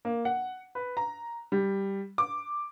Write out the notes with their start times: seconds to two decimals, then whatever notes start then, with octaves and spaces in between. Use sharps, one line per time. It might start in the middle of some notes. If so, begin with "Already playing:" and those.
0.05 A#3
0.25 F#5
0.75 B4
0.97 A#5
1.52 G3
2.18 D6